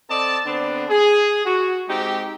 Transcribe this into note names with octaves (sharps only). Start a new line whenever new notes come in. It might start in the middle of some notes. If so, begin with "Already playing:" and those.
C4 A4 D5 D#5 A5
D3 B3 C4 D4
G#4
F#4
G#3 C4 D#4 G4